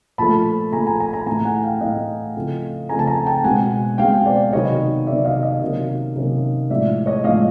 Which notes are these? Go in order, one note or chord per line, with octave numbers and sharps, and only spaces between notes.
A#2 F3 A3 A5 B5
A#2 F3 A3 G#5 A#5
G#5 A#5
G#5 A#5
G#5 A#5
A2 E3 A3 G#5 A#5
F#5 G#5
F5 G5
A2 E3 A3 D#5 F5
C#3 F3 A3 C4
C#3 F3 A3 C4 G#5 A#5
A5
G#5 A#5
G5 A5
B2 G#3 C4 F#5 G#5
B2 G#3 C4 F5 G5
C5 D5
C3 D#3 F#3 B3 C#5 D#5
C3 D#3 F#3 B3 D5 E5
D#5 F5
D#5 F5
C3 D#3 F#3 A#3 C#4
C3 D#3 F#3 A#3 C#4
A2 F3 G#3 D5 E5
C#5 D#5
A2 F3 G#3 D#5 F5